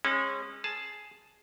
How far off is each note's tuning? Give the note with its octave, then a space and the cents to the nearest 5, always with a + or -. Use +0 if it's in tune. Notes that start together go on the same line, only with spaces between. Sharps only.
G#3 -20 C#4 -30
G#4 +10 A5 +0